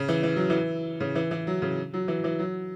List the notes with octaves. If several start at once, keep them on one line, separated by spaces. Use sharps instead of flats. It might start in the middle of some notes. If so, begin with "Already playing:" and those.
Already playing: C#3
E3
E3
F#3
E3
C#3
E3
E3
F#3
C#3
F#3
E3
E3
F#3